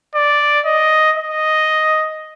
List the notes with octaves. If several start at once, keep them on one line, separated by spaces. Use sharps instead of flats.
D5
D#5
D#5